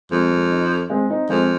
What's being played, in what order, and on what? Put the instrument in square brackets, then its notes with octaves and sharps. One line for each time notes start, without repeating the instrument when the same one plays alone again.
[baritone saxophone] F2 [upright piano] G#3 C4
[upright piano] G#3 C4
C4 D#4
G#3 C4
C4 D#4
[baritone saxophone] F2 [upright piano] G#3 C4